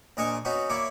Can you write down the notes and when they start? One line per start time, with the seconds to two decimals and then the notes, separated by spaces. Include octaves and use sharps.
0.17 A#1 A#2 A#4 D#5 G#5 C#6
0.45 B3 C#4 D#4 F#4
0.70 A#3 E4 C#5 D5